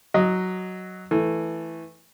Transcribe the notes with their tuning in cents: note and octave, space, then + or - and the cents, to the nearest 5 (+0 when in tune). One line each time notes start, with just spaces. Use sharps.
F#3 +0 D#5 +0
E3 +0 A3 +0